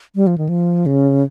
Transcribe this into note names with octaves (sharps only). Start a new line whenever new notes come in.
G3
F3
D#3
F3
C#3